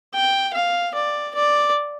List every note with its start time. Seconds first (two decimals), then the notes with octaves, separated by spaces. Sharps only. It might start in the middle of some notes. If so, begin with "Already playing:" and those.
0.14 G5
0.53 F5
0.94 D5
1.35 D5